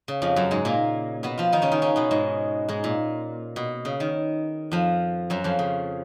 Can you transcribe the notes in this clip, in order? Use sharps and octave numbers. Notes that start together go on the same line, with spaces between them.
C#3
F2 F3
F#2 F#3
G#2 G#3
A#2 A#3
B2 B3
F3 F4
D#3 D#4
C#3 C#4
D#3 D#4
C#3 C#4
B2 B3
G#2 G#3
G#2 G#3
A#2
B2
C#3
D#3
F2 F3
F#2 F#3
F2 F3
C#3